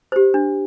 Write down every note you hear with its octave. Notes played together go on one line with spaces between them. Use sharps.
G4 C5
D4